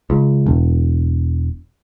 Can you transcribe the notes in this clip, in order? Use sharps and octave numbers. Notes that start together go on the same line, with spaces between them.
C#2
E1